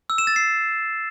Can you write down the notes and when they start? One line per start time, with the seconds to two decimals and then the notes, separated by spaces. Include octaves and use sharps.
0.10 E6
0.18 E7
0.27 A6
0.36 C7